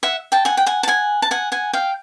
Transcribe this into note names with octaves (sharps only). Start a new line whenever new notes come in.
E5 F#5
G5 A5
F#5 G#5
G5
F#5 G#5
A5
F#5 G#5
A5
F#5 G#5
F#5 G#5
F5 G5